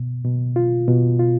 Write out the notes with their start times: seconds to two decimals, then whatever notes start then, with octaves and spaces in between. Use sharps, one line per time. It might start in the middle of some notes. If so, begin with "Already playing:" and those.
Already playing: B2
0.24 B2
0.56 F4
0.88 B2
1.19 F4